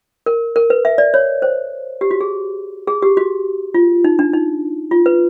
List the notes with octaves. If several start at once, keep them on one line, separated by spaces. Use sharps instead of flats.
A#4
A#4
B4
E5
D5
C#5
C5
G4
F#4
G#4
G#4
G4
F#4
F4
D#4
D4
D#4
F4
B4